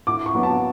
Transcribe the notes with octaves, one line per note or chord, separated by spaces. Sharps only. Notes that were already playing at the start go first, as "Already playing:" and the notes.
A2 D6
C#6
F#3 B3
A5